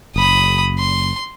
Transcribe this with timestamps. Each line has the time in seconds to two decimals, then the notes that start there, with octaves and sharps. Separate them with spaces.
0.16 F#1 B5 D#6
0.79 C6